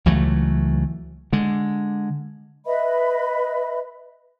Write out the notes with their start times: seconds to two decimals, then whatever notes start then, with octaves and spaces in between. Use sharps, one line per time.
0.06 C#2 E3 F#3 A3
1.33 D3 G#3
2.66 B4 D#5 E5 B5